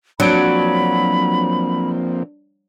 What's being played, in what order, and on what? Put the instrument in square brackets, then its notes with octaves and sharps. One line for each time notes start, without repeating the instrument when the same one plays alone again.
[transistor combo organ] F3 A#3 C4 [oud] F#3 [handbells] D4 D5 D7 [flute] B5